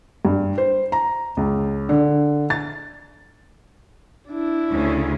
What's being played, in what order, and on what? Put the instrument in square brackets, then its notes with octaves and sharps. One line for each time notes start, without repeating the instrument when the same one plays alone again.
[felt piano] G2
C5
A#5
C#2
D3
A6
[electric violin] D4 E4
[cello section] D2 C#3 C#4